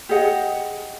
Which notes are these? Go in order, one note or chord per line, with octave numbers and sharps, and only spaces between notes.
G4 G#4 D#5 F#5